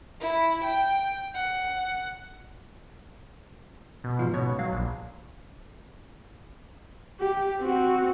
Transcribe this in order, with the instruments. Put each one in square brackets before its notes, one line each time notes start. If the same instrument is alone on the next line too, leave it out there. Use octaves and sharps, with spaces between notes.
[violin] E4
G5
F#5
[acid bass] B2
[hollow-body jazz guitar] B1 G#2 F3
[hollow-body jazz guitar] C#2 G#2 C#5 [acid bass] B2
[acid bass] F#3 [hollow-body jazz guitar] F5
[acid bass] A#1
[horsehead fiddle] G4
C4 F#4